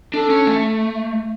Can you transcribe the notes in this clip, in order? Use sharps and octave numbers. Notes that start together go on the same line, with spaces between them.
D4 A4
C#4
A3